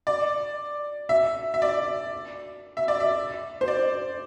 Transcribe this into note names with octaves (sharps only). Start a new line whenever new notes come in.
D5
E5
E5
D5
E5
D5
E5
C5
D5